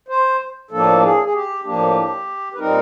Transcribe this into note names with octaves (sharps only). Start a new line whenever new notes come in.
C5
A2 F3 A#3 D4 A4
G#4
G#4
G4
A2 F3 A#3 D4 G4
B4
A#2 G3 C4 D#4 A#4